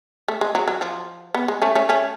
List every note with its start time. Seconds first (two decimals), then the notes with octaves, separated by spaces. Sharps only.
0.28 A3
0.41 G#3
0.55 F#3
0.68 F#3
0.81 F3
1.34 B3
1.48 G#3
1.62 A3 C#4
1.75 A3 C#4
1.89 A3 C#4